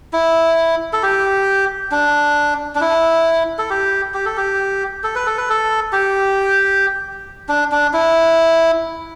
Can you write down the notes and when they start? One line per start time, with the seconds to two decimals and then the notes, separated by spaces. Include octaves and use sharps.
0.13 E4
0.93 A4
1.03 G4
1.91 D4
2.75 D4
2.81 E4
3.59 A4
3.70 G4
4.14 G4
4.25 A4
4.37 G4
5.04 A4
5.15 B4
5.26 A4
5.38 B4
5.50 A4
5.92 G4
7.49 D4
7.72 D4
7.93 E4